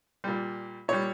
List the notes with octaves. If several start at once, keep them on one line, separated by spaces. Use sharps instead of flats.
A#2 G3
A#2 G3 C#5